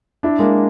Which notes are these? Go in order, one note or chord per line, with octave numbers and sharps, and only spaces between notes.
D4 E4
G#3 A#3